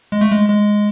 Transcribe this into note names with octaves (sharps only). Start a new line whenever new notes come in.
G#3
A3
G#3
G#3